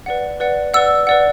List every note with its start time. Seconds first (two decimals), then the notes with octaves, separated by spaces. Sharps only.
0.06 B4 D5 F#5
0.40 B4 D5 F#5
0.74 B4 D5 F#5 E6
1.07 B4 D5 F#5